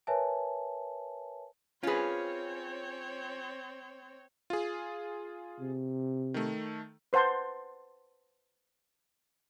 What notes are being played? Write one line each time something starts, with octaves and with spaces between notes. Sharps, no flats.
A#4 B4 C#5 E5 G#5 A5
C4 C#4 F4 G#4 B4 C#5
F4 G#4
C3
D#3 A3
B4 C5 F#5 A5 C6